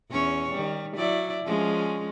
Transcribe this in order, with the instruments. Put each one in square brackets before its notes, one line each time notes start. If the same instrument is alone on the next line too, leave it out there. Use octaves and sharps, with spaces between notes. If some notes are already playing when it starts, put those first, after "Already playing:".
[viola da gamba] E2 C#4 C#5
D#3 G3
F#3 E4 D5
F3 G#3 C#4